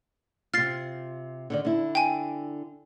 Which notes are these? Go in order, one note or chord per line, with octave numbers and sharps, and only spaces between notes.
C3 F4 F6 A6 C7
D3 D#3 D5
D3 E4
G5 G#5